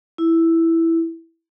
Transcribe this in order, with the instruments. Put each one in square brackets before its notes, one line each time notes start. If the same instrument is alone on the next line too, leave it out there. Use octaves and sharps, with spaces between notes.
[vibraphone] E4